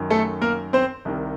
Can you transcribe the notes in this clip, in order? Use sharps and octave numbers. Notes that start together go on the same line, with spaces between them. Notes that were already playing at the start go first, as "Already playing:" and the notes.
Already playing: F#2 D#3
A3 A4
A#3 A#4
C4 C5
C2 C3 D#3